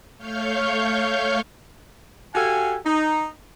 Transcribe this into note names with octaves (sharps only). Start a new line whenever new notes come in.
A3 C#5 F5 C#6 F6 G6
F#4 G4 A4 F5 G#5
D#4